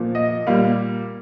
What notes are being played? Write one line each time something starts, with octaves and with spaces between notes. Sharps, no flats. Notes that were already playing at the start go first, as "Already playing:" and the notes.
Already playing: A#2 F3 A#3
D#5
A#2 G3 A#3 F5